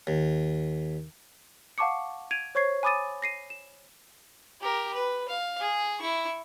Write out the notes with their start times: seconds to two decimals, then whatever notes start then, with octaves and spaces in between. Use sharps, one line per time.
0.07 D#2
1.78 F5 F#5 A5 C#6 D6 C#7
2.31 G#6 D7 D#7 F7
2.55 C5 C#5 C#6 G#6 C7
2.83 G#5 B5 D6 D#6 A6 D#7
3.22 A#6 C7 D#7
3.50 E7
4.61 G4 A#4
4.94 B4
5.28 F5
5.60 G#4
6.00 E4 C#6